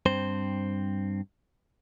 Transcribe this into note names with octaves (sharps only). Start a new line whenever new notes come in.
G2 C4 C5